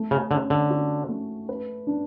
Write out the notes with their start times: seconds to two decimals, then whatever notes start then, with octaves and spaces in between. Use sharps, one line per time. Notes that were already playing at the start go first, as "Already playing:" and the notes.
Already playing: A3
0.11 C#3
0.31 D3 C#4
0.50 D3
0.70 F#4
1.09 A3
1.49 B4
1.87 D4